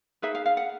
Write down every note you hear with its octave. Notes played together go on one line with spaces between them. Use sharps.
D#4 G#4 B4 E5
F5
F5
F#5